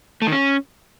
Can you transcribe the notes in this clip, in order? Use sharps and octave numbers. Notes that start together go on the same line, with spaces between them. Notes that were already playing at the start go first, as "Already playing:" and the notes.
A3
D#3
C#4